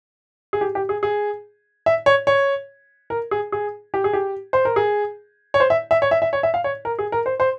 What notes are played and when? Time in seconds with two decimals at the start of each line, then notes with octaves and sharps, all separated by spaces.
0.53 G#4
0.61 G4
0.75 G4
0.89 G#4
1.03 G#4
1.86 E5
2.06 C#5
2.27 C#5
3.10 A#4
3.31 G#4
3.52 G#4
3.94 G4
4.04 G#4
4.13 G4
4.53 C5
4.65 A#4
4.76 G#4
5.54 C#5
5.60 C5
5.70 E5
5.91 E5
6.02 C#5
6.11 E5
6.22 E5
6.33 C#5
6.43 E5
6.54 F5
6.64 C#5
6.85 A#4
6.99 G#4
7.12 A#4
7.26 C5
7.40 C5